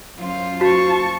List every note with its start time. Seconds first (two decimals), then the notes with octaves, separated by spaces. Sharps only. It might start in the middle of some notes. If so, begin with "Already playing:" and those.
0.18 F#2 F4 C5
0.61 F#4 A5 C#6